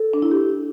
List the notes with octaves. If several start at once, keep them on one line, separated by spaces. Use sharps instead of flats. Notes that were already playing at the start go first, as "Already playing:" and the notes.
Already playing: A4
D4
E4
G4